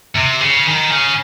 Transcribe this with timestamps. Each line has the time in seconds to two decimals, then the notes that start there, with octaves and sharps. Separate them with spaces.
0.16 C3
0.40 C#3
0.66 D#3
0.90 C#3